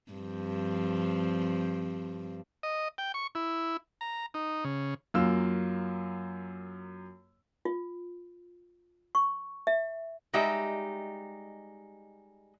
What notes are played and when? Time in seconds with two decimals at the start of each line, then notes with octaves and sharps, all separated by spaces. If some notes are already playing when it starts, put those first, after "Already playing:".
0.13 G2 F3 C4
2.63 D#5
2.98 G5
3.14 C#6
3.35 E4
4.01 A#5
4.34 D#4
4.65 C#3
5.14 F#2 A#3 F4 E6
7.65 F4
9.15 C#6
9.67 E5
10.33 G3 G#3 D#4 G4 E5